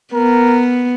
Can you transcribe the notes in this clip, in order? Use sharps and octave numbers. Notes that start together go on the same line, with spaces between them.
B3 A#4